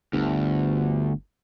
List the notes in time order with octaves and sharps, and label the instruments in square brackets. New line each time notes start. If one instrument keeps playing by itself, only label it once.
[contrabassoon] G1 [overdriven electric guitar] D2